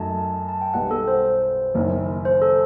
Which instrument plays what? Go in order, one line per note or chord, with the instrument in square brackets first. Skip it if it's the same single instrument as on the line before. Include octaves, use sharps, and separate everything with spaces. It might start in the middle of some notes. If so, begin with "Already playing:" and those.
Already playing: [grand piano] F#2 F#3 A3 D#4 [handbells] A5
[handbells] A5
G5
[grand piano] B1 B2 G3 [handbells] F#5
[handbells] A4
C5
[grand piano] F#1 F#2 D#3
[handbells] C5
A4